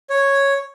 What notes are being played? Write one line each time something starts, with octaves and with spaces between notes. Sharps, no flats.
C#5